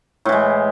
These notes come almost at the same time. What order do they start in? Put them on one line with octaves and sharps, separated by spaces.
A2 E3 G#3